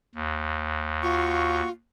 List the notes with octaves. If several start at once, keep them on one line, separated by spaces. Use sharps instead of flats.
D#2
F4 F#4 C#6